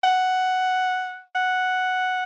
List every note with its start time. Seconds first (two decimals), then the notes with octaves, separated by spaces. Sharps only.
0.04 F#5
1.35 F#5